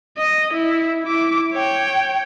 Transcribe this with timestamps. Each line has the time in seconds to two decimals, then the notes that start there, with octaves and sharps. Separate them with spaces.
0.18 D#5
0.54 E4
1.04 E4 D6
1.53 C#5 G5